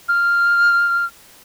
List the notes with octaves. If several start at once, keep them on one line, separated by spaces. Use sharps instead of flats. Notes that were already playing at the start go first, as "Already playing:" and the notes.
F6